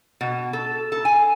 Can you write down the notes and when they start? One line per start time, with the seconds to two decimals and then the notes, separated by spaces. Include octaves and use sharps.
0.21 B2
0.53 A4
0.92 A4
1.05 G#5